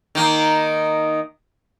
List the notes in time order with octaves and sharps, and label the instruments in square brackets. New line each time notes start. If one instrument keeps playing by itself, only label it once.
[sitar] D#3 A#3